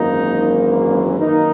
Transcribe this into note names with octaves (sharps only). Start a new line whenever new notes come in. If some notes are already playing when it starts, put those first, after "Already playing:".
Already playing: G#1 F#2 E3 A#3 D#4
F#2 D#3 A#3 D#4